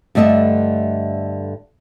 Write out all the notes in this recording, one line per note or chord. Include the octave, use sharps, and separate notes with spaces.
G2 D3 A3 D#5 E5